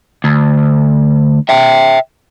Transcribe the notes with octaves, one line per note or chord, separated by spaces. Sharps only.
D2
E5 G5